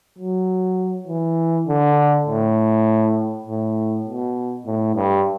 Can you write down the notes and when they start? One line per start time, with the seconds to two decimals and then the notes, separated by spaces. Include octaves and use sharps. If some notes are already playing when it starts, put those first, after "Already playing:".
0.19 F#3
1.08 E3
1.68 D3
2.27 A2
3.46 A2
4.06 B2
4.66 A2
4.95 G2